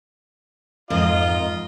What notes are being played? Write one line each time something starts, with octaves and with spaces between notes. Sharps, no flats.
F2 G#2 F4 A#4 D#5